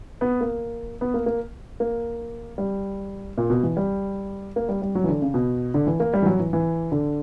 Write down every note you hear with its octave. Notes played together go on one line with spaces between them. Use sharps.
B3
A#3
B3
A#3
A#3
A#3
G3
A#2
B2
E3
G3
A#3
G3
G3
F#3
E3
D3
C#3
B2
D3
E3
A#3
G3
E3
F#3
E3
E3
D3